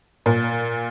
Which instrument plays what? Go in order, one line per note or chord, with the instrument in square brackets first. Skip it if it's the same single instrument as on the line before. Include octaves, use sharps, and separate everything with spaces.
[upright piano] A#2